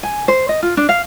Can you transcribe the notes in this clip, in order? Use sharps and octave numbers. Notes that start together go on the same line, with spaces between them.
G#5
C5
D#5
F4
D4
F5